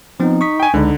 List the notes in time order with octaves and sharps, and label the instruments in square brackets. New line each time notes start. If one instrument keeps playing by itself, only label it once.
[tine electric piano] F3 B3 C4 [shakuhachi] D#4
[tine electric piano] C#6 D#6 B6
[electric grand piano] G5 G#5
[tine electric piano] C#2 G#3 B5 [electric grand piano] D3 [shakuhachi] D#4